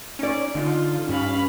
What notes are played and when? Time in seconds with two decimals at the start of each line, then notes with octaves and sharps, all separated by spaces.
0.19 C#4 D#4 D5
0.55 D3 D#4 F4
1.09 G2 C#4 F5 B5